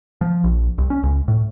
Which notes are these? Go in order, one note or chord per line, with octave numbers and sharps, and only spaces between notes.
F3
A#1
C2
C#4
C#2
A2